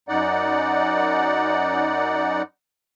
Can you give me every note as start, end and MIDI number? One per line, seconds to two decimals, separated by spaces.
0.09 2.42 42
0.09 2.42 63
0.09 2.42 74
0.09 2.42 78